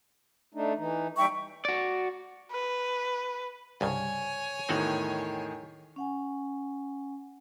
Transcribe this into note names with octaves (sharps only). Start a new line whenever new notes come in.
A3 D4 D#4
E3 D#4
D#2 G3 D#4 E5 G5 C#6
F#4 D5
B4
C2 G2 C#3 C#5 G#5
E2 A2 D#3 C4 F#4 F#5
C#4 F#5 G#5